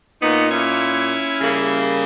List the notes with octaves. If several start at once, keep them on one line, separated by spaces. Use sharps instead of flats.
A#2 A#3 B3 D#4
C#4 E4
C#3 G3 A#3